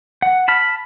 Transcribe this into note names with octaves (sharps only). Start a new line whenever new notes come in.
F#5
A5 B5 F6